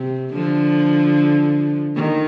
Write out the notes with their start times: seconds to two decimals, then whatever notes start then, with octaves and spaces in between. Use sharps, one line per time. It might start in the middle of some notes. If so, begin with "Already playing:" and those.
Already playing: C3
0.33 D3 F3
1.96 D#3